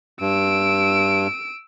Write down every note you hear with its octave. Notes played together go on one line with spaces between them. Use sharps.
G2 E6 D7